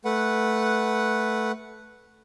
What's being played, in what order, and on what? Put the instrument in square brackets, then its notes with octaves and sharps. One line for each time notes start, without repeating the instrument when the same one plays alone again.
[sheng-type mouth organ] A3 B4 F#5